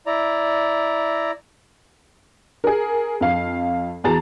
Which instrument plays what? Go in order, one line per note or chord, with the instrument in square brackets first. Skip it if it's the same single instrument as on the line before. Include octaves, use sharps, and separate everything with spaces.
[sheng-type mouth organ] E4 D5 A#5
[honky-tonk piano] G#4 A#4
F2 F5 C7
E2 F#4 G#4 A5 A#5 A6